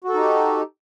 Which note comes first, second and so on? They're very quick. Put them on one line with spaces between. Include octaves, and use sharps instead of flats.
F#4 A4 D#4 G4